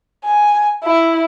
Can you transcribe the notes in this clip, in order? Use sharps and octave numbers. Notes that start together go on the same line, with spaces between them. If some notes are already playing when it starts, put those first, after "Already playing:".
G#5
E4